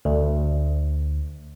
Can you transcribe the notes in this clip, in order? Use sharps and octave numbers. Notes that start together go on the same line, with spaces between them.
D2